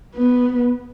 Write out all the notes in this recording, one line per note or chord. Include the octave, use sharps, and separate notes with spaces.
B3